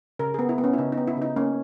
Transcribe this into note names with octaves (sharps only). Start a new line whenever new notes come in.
C#3 A#4
B3 G#4
E4
B3
C#4
E4
C#3 D#4
D#4
B3
E4
C#3 D#4
A#3 C#4